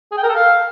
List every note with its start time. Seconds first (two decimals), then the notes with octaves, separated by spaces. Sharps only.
0.11 G#4
0.17 G5
0.23 A#4
0.29 A4
0.35 F5